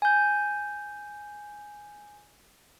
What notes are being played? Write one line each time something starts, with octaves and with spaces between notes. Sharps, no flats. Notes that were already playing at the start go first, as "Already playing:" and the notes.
G#5 G6